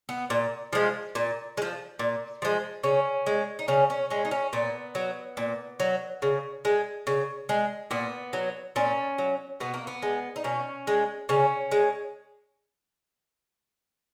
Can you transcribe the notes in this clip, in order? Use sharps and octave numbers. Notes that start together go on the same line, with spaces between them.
B3
A#2
F3 G#3
A#2
G#3
F3
A#2
F3 G#3
C#3 C#4
G#3
D#4
C#3 C#4
C#4
G#3 C#4
D#4
C#4
A#2 B3
F#3
A#2
F#3
C#3
G#3
C#3
G#3
A#2 B3
F#3
A#2 C#4
F#3
B2 B3
A#3
B3
G#3
D#4
B2 C#4
G#3
C#3 C#4
G#3